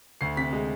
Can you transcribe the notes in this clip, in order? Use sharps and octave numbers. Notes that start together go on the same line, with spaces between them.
D2 C7
C3 B6
G#3